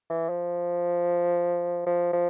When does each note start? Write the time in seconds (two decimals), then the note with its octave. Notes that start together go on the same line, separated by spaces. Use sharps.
0.10 E3
0.29 F3
1.86 F3
2.13 F3